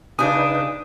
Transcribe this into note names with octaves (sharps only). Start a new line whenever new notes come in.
C#3 D4 D#4 B4 G#5 D#6